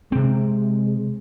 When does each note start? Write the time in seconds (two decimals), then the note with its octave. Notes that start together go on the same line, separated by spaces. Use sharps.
0.12 C3 G#3 C4